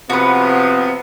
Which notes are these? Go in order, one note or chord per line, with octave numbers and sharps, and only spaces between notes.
C3 F3 B3 F#4 B4